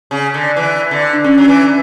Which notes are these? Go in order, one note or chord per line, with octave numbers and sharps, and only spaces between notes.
C#3
D3
E3
D3
D4
D3 C#4
F#3 C#4
E3